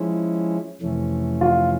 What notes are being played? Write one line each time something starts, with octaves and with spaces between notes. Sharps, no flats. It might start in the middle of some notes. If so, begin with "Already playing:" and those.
Already playing: F3 G#3 C#4 E4
F2 C3 E3 A3 C#4
F4